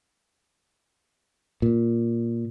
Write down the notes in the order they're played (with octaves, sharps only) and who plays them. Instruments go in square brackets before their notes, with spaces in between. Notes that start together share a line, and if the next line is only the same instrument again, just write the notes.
[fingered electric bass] A#2